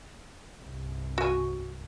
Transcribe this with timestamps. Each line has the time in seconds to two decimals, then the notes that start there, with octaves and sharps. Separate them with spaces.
0.63 C2 G2
1.18 F#4 G#5